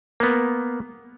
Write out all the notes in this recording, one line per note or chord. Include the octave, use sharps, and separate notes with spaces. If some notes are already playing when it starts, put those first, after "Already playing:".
A#3 B3